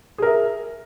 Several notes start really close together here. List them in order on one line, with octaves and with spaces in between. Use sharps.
G#4 A#4 E5